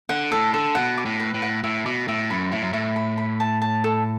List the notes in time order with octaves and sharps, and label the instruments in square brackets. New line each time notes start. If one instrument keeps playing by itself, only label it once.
[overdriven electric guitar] D3 [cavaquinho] F#5
[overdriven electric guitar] A2 [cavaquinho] A4
[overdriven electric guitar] D3 [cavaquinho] A4
[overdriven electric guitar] B2 [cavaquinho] F#5
[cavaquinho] D6
[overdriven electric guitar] A2
[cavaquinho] B4
[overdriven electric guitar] A2
[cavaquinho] F#5
[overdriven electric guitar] A2 [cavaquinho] E5
[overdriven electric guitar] B2 [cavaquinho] D6
[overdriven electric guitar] A2 [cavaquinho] E5
[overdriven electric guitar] F#2 [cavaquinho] B5
[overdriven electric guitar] A2 [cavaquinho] E4
[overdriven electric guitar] F#2
[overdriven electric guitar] A2 [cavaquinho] E4
[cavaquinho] B5
B5
A5
A5
A4